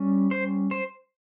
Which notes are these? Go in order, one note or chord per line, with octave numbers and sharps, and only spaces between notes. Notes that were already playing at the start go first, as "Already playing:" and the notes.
Already playing: G3 C#4
C5
C5